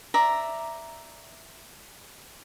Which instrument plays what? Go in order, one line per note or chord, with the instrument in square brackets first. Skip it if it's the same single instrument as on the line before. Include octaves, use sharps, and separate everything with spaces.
[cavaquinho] D5 E5 A#5